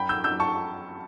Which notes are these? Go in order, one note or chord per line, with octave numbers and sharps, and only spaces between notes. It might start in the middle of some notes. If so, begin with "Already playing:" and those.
Already playing: F#2 G5 B5
E6 G6
F#2 E6 G6
A5 C#6